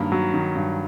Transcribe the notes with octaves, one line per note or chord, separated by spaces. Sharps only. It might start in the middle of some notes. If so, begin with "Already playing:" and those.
Already playing: G2 D#3 F#3 A#3
F#3
D#3
G2